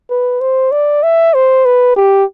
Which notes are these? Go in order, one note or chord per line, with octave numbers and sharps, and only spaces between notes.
B4
C5
D5
E5
C5
B4
G4